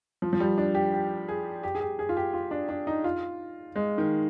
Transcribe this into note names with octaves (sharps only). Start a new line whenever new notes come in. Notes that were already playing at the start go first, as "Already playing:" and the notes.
F3
F3
G3
D4
G4
G4
G#4
G4
G#4
G4
G#4
F4
G4
F4
D4
D4
D#4
F4
G#3
D#3